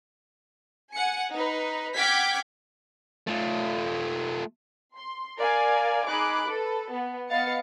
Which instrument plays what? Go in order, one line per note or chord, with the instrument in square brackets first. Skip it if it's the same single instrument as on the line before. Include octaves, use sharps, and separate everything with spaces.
[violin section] F#5 G#5 C#7
D#4 B4
F#5 G5 D6 F6 G#6 B6
[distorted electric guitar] A3 F4
[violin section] C6
A#4 D5 F5 G#5
D#4 G#4 B5 D6 F#6
A4 B4 A5
B3
B3 D#5 F5 A6 C#7